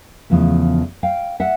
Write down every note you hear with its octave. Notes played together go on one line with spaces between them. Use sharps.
E2 C#3 F3 A3
F5 G5
E5 F#5